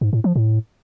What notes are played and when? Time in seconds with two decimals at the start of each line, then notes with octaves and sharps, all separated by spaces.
0.01 G#2
0.13 A2
0.24 F3
0.36 A2